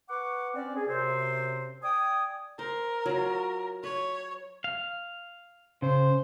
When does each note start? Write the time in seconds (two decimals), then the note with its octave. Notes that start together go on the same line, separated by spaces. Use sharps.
0.10 B4 F#5 C#6 D6
0.54 C4 C#4 D5
0.75 G#4
0.88 F#2 C3 C4 C5
1.82 D5 G5 G#5 D#6
2.59 A#4 C5
3.06 F#3 F4
3.84 B4 C#5
4.64 F5
5.82 C#3 C5